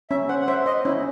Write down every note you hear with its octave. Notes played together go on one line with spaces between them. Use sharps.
C#4 E5
C5 F#5
F#5
C5 E5
C5 D#5
C#4 E4